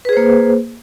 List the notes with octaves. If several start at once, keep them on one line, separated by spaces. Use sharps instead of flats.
A#3 G#4 B4 C5